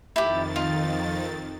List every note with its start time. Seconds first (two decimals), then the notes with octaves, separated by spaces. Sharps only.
0.16 F2 D#3 E4 G4 A6
0.56 F4